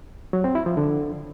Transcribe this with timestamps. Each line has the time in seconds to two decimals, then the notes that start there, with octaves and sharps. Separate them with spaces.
0.33 F#3
0.44 C4
0.55 E4
0.66 F3
0.77 D3